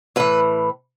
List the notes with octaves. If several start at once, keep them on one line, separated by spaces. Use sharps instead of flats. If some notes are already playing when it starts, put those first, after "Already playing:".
A2 E3 B4